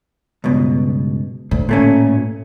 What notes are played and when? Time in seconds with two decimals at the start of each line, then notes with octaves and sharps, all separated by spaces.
0.44 C#2 G2 B2
1.51 D2 A2
1.69 A#2 A3 C#4